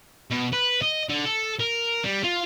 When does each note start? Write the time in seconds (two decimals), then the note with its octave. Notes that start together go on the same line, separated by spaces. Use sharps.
0.30 B2
0.53 B4
0.82 D#5
1.09 D3
1.26 A4
1.60 A#4
2.04 G3
2.24 F4